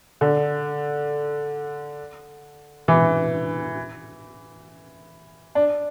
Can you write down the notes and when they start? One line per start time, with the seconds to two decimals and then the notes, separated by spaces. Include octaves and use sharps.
0.21 D3
2.88 E3
5.55 D4